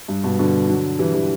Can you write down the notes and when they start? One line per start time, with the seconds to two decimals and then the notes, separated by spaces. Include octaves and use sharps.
0.08 G2
0.24 G2 B2
0.39 B2 D3
0.69 D3 F#3
0.99 E3 G3
1.14 E3 G3